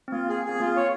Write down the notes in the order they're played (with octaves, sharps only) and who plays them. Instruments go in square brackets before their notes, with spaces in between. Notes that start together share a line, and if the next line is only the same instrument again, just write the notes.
[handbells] C4
[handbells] A#3 [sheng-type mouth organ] F4
[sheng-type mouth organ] G#4
[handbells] C4 [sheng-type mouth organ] G#4
[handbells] A#3 [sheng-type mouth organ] F4
[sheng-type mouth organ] C#5